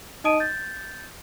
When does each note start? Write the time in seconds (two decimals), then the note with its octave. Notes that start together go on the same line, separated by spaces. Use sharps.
0.24 D#4 D#5 A5 D#6 D7 D#7
0.40 G6 A6